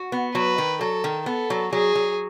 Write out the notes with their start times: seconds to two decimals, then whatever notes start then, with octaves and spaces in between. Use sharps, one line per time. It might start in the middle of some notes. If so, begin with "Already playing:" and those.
Already playing: F#4
0.12 B3
0.35 F#3 B4
0.58 D#3
0.81 F#3 A4
1.04 D#3
1.26 B3 A4
1.50 F#3
1.73 F#3 G#4
1.95 F#3